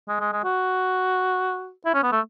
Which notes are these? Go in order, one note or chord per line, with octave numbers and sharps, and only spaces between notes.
G#3
G#3
G#3
F#4
E4
C#4
B3
A3